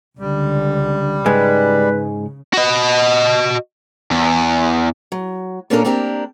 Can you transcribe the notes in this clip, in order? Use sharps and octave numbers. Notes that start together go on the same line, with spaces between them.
C#2 D3 G3
G#2 C#3 G#3 B4
F#4 D#5
E2
F#3
A#2 A#3 C#4 D4 A4 A#4
A#3 C4 D4 G4 A#4